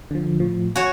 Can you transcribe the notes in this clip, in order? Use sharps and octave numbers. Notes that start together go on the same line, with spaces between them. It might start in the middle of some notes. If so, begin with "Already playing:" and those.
D3 F3
A2 F3
F#4 C#5 G#5